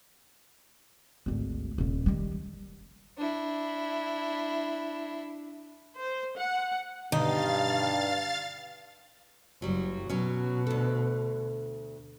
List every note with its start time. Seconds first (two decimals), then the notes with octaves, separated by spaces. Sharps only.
1.26 G#1 D2
1.78 D#1 A#1
2.06 D#3 G3
3.18 D4 E4
5.98 C5
6.37 F#5
7.12 G2 B2 D3 D#3 D#4 F5 A6
9.62 F#1 F#3 G3
10.09 B2 F#3 C#4
10.67 D2 A4